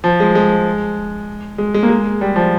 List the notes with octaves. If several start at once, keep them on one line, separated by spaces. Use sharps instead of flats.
F3
G#3
G#3
G#3
G#3
A#3
G#3
G3
F3